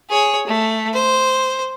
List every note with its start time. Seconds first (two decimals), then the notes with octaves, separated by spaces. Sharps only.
0.10 G#4 C#5
0.48 A3
0.94 C5